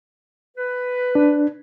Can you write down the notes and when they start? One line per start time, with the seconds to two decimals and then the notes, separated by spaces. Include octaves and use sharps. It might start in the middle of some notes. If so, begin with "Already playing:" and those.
0.57 B4
1.15 D4